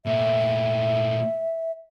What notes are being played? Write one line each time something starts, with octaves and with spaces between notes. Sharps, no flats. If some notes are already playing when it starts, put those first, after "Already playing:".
A#2 A3 E5